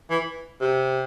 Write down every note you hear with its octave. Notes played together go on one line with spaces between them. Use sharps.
E3
C3